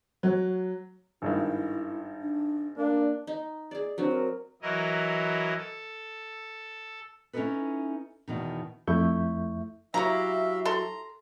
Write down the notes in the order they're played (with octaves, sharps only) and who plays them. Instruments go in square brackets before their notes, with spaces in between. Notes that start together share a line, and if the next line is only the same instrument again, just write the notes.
[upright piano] F#3
[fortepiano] G#1 G2 D#3 [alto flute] E4
[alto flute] D4
[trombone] A#3 [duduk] D4 [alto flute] D5
[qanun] D#4
G#4 D5
[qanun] F#3 C4 F#4 [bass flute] D4
[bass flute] A#4
[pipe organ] E3 F#3 E4 A#4 D#5
A4
[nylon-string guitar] C#4 D#4 E4 G#4 A4 B4
E2 B2 D#3
[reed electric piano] F2 A3 E4 E5 C#6 G6
[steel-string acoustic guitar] F#3 E4 G4 [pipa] C#5 A#5 [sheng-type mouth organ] E5 F5
[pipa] A4 C6 [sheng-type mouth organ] A#5